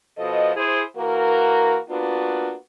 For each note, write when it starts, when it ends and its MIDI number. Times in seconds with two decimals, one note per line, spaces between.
0.17 0.52 47
0.17 0.52 53
0.17 0.52 69
0.17 0.52 75
0.55 0.81 64
0.55 0.81 68
0.55 0.81 72
0.96 1.76 52
0.96 1.76 58
0.96 1.76 66
0.96 1.76 70
1.89 2.54 58
1.89 2.54 59
1.89 2.54 62
1.89 2.54 65
1.89 2.54 66